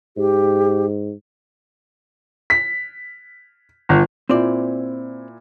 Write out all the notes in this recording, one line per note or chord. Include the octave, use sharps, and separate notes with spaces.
G#2 G4
B6
G1
A#2 C4 E4 C5 D5